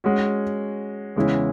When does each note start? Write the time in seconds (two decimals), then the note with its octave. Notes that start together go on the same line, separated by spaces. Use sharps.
0.04 G#3 C#4 F#4
1.16 E2 C#3 G#3 C#4 E4